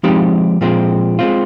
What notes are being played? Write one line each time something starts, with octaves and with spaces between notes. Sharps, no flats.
F3 G#3 C4 D#4 G4
A#2 F3 G#3 C4
G#3 C4 F4